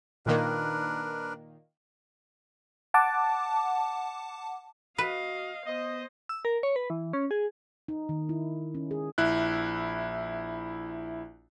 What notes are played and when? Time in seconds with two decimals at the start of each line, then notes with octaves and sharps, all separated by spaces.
0.26 A#2 D#3 A#3 D4 A#4 B4
2.94 F#5 A5 D6
4.98 F#4 B4 D#5 F5
5.66 B3 C5 D#5
6.29 E6
6.45 A#4
6.63 C#5
6.76 B4
6.90 E3
7.13 C#4
7.31 G#4
7.88 D#4
8.09 D#3
8.29 E4
8.75 C#4
8.91 G#4
9.18 A#1 E4 F#6